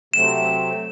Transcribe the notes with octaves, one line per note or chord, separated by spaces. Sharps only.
C3 F#3 A3 C4 E7